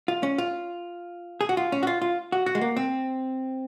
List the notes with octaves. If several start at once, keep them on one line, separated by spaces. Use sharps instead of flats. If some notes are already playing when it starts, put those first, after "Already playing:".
F4
C#4
F4
G#4
F#4
F4
C#4
F#4
F4
F4
F#4
F#4
G#3
A#3
C4